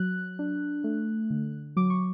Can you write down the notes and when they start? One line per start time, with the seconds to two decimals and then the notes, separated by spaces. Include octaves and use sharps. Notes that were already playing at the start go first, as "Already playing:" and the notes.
Already playing: F#3 F#6
0.39 D4
0.84 A3
1.30 D3
1.77 F#3 D6
1.90 C#6